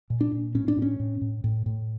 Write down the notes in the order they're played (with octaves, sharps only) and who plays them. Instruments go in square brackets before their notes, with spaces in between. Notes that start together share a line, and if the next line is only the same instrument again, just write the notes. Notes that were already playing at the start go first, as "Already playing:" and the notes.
[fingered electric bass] A#2
D4
A#2
A2 C#4
D4
A2
C#4
A2
A2
A2
A2